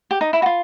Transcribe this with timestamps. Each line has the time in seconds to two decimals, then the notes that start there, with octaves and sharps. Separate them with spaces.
0.11 G4
0.21 D#4
0.33 E4
0.42 F#4
0.46 F4